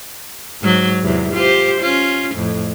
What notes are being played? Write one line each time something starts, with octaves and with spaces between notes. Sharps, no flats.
G#2 F#3
E2 C3 F#3
F4 G4 C5
C#4 F4
F2 A2